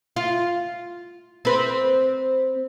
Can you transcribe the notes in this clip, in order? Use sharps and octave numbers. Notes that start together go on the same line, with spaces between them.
F4
C4 B4